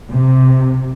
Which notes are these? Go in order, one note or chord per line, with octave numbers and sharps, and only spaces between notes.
C3